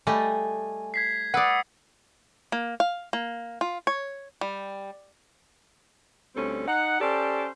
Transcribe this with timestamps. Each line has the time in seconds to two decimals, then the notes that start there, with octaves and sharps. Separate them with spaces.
0.07 G3 A3 D#5 G#5
0.94 G#6 B6 C7
1.34 B4 D5 F#5 D#6 E6 C#7
2.52 A#3
2.80 F5
3.13 A#3
3.61 F4
3.87 C#5
4.41 G3
6.36 D2 G3 C4 C#4 A4
6.67 D#4 F#5
7.00 C#4 G4 A4 C5 D5